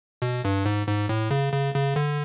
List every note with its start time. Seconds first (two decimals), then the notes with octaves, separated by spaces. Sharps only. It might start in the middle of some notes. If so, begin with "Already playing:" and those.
0.22 B2
0.45 G2
0.65 G#2
0.87 G#2
1.09 A2
1.31 C#3
1.53 C#3
1.74 C#3
1.96 D3